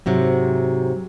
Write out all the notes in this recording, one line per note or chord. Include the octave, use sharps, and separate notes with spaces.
G#2 C3 F#3